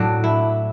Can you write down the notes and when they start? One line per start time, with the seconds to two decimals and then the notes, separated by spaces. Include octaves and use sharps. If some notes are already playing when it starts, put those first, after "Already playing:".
Already playing: A2 F#3 D4
0.24 E4